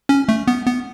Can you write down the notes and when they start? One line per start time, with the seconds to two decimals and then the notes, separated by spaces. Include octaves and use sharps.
0.09 C#4
0.29 A3
0.48 B3
0.66 B3